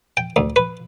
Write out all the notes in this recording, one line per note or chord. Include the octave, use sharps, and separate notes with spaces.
G5
D2
B4